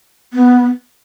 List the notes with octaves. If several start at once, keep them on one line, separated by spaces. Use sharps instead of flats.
B3